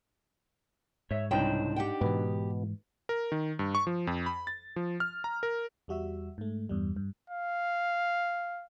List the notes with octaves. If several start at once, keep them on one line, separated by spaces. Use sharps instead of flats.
G#2 C#5 E5
C2 C#3 D4 D#4 C5 G5
G4 F#5 G5
G#2 B2 E3 B3
A#4
D#3
G2
C#6
F3
F2
B5
A6
F3
F6
A#5
A#4
E2 G3 F#4 E5 E6
G#2 A3
E2 G2 G3
G2
F5